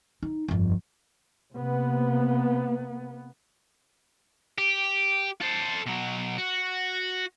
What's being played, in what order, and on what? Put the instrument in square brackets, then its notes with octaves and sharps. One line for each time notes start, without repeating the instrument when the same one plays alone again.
[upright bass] D#4
G1 F2
[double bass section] C3 A#3 B3
[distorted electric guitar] G4
A4 C5
B2 F#3
F#4